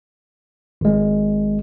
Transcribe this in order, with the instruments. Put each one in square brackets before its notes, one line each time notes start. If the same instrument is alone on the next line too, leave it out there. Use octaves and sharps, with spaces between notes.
[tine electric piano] G#1 G#3